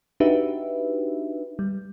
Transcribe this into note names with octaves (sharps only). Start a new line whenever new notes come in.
D4 D#4 F#4 G4 B4 E5
G3